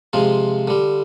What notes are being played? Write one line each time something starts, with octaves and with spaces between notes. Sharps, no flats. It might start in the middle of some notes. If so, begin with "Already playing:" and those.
C3 F3 G#3 F4
D3 G3